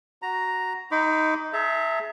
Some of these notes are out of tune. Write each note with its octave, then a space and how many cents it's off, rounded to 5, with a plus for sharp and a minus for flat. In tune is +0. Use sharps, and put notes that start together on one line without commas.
F#4 +0 A#5 +0
D#4 +10 B5 +40 D6 -25
G#4 +35 E5 +0 A#5 -35